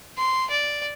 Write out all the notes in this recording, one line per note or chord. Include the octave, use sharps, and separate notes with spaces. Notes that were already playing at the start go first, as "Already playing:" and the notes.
C6
D5